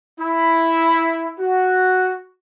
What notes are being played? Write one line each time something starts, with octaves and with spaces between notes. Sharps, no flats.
E4
F#4